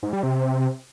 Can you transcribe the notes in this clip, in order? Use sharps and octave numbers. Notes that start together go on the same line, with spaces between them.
G#2
G3
C3